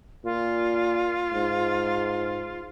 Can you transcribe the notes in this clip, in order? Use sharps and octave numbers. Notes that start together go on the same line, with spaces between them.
A#2 F4
G#2